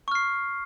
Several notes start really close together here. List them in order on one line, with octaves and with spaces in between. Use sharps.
C#6 F6 C7